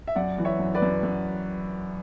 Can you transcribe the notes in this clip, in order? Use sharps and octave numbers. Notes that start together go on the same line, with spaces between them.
E5
F#2 D5 F#5
E3
C#5 E5
F#2
B4 D5
F#2
F#2